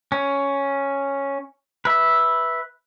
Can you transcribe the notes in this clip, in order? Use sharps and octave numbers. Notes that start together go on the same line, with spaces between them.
C#4
B4 E5